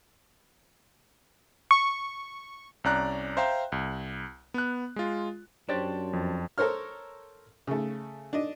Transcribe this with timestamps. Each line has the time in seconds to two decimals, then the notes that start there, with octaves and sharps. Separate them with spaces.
1.71 C#6
2.84 C2 C#4 D5 A#5 F#6
3.37 C5 E5 F5 G5 A#5 C6
3.72 C2
4.54 B3 F#6
4.96 G#3 F4
5.69 F#2 D4 G4 C5 C#5 A6
6.13 F2
6.58 A4 A#4 C5 C#5 F6
7.67 C#3 A3
8.33 D4 D#5